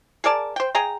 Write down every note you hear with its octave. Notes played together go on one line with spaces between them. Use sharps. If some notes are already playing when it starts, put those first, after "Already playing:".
G#4 A#4 D5 A5
C5 G5
G#4 D#5 G5 A#5